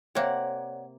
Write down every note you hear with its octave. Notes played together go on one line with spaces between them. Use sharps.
C3 A#3 C#5 D5 F#5